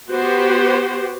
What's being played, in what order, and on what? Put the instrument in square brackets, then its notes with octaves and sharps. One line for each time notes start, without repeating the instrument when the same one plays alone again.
[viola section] B3 F#4 G4 C5